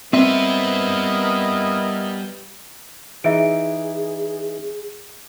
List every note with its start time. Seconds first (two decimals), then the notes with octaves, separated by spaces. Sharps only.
0.13 G3 B3 C4 E4 A#4 B4 D#5 E5
3.24 E3 D#4 G#4 E5 D7